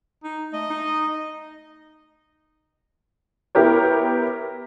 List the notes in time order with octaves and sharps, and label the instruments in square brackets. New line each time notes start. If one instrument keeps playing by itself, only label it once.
[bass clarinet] D#4
[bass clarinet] A3 [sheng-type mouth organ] D#5
[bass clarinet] D#4
[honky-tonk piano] B3 E4 G4 A#4 C#5